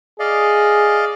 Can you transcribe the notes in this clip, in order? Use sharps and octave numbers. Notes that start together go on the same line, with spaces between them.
G#4 D5 D#5 F5